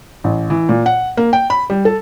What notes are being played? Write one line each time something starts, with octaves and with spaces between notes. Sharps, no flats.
A1
E3
A#2
F#5
A#3
G5
B5
G3
A4